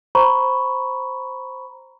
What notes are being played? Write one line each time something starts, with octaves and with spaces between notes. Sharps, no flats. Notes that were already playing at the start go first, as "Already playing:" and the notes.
C5 A#5 B5 C#6